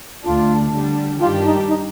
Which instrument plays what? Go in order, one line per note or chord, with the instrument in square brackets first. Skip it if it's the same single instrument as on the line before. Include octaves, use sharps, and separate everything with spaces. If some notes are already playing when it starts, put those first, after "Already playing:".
[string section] D2 D3 A3 D4 [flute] F4
[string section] D3 G3 D4
[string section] G2 D#3 G3 D4 G4 [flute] F4
[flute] D#4
D#4